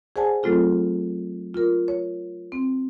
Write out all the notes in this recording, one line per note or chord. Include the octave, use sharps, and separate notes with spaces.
G#4 C5 D5 F#5 G#5 A5
F#3 A3 C4 F4 A4
F4 A#4
C#5
C4